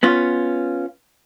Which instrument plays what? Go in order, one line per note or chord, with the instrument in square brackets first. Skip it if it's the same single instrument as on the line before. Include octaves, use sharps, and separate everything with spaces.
[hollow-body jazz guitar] B3 C#4 F4